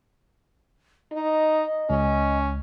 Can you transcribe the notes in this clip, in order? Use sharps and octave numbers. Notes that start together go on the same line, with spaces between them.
D#4 D#5
C#2 C#4